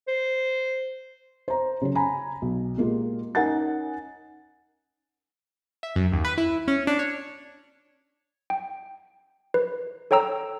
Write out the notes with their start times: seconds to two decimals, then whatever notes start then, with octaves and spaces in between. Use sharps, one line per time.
0.08 C5
1.48 C5 A#5
1.81 C#3 F#3 C#4
1.95 G#5 A#5 B5
2.42 B1
2.77 A#2 G#3 A#3 F4 G4
3.35 C#4 D#4 A#4 F#5 G#5 A6
5.83 E5
5.96 F#2
6.12 D#2
6.25 B4
6.38 E4
6.68 C#4
6.87 D4
6.99 C#5
8.50 G5
9.54 B4
10.11 A4 C#5 G5 A#5 E6